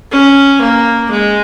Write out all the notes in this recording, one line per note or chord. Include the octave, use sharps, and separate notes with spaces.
C#4
A#3
G#3